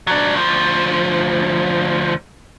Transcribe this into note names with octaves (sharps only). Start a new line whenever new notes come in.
F#3 D4
D2 F3